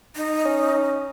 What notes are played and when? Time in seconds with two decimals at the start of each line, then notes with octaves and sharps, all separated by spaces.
0.16 D#4
0.45 C#4